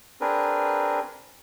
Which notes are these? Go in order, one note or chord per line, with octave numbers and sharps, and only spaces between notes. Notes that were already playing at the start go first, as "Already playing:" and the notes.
C4 D4 G#4 A#4 B4